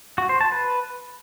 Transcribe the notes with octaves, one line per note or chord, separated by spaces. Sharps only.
F#4
C5
A5
B4